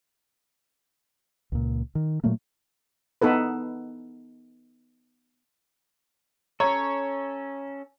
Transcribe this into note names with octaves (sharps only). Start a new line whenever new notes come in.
C#2 A#2
D#3
A#2 F#3 A3 A#3
B3 D#4 A4 B4
C#4 A4 C#5 A#5